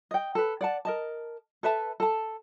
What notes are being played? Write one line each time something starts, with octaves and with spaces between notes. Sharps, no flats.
D#5 G5
A4 B4
D5 F#5 A5
A#4 D#5 A5
A4 B4 E5 A5
A4 A5